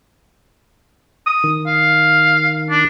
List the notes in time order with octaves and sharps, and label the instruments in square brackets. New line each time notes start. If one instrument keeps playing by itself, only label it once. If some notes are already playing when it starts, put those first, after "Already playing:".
[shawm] D#6
[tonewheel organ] D#3
[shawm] F5
D4